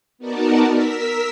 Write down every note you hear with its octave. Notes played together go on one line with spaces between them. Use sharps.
B3 D#4 F#4 A#4 D5 A5
A#4 E6 B6